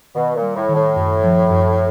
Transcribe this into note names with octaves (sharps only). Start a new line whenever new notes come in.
B2 D#3
A#2
G3
A2
D#3
A2
F#2
F3
F#2